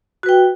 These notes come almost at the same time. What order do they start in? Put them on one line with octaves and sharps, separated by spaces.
F#4 B4 G5